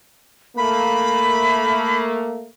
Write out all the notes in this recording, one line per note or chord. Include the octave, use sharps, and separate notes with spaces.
A3 A#3 B5